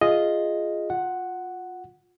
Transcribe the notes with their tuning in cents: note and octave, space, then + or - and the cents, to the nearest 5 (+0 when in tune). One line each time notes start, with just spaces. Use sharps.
F4 +0 G#4 +0 D#5 +0
F4 +25 F#5 +0